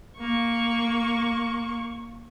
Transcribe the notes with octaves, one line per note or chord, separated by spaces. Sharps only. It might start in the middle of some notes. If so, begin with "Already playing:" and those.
A#3 C#6